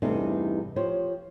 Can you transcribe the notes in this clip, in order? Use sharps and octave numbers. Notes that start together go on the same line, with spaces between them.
E2 G2 C3 A3 D4 D#4
F3 G4 C5 C#5